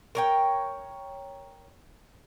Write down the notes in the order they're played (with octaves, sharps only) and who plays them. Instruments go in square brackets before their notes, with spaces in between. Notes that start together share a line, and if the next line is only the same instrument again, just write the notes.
[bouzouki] A#4 C#5 G5